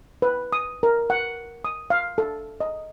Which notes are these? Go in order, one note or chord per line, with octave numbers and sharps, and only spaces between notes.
B4
D#6
A#4
F#5
D#6
F5
A4
D#5